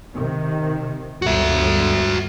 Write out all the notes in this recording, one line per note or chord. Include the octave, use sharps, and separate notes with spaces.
C3 D#3
G1 D2 F#4 E5